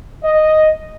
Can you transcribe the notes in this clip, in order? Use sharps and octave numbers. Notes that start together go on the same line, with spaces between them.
D#5